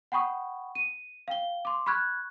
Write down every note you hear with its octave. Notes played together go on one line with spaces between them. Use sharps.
F#5 G5 B5 C#6 D#6
D#7
F5 G5 G7
C6 D6
B5 C#6 F6 F#6 G#6